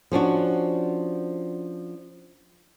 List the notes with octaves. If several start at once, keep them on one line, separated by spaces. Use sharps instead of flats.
F3 C#4 D4 F#4